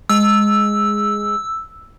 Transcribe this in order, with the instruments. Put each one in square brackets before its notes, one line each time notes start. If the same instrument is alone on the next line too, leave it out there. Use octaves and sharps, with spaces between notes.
[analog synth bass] G#3 [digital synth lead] E6